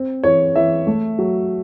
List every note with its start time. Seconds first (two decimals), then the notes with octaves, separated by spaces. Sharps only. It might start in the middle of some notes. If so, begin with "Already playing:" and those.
Already playing: C4
0.24 E3 C#5
0.56 E3 E5
0.87 A3
1.19 F#3